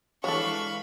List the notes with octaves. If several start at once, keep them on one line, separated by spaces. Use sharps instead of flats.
E3 G#3 D4 A4 C#5 F5 B5 C#6